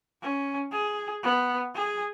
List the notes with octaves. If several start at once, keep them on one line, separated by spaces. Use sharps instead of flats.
C#4
G#4
B3
G#4